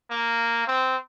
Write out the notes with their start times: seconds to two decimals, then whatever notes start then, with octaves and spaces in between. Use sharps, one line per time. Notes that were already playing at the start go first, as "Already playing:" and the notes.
0.11 A#3
0.67 C4